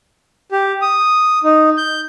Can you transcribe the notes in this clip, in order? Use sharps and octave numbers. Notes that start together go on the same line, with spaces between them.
G4
D#6
D#4
G6